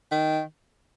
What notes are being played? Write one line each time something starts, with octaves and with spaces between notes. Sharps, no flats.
D#3